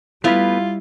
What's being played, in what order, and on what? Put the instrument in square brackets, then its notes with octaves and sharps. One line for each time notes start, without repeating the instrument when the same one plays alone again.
[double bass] G3 [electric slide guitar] A3 B3 B4 [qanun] E4 F5 [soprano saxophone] F4